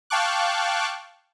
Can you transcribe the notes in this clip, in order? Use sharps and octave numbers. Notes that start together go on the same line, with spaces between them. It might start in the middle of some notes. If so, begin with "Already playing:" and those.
F5 G5 A5 C#6 D6 F#6